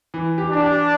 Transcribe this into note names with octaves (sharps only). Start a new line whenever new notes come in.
E3
G4
D4
G4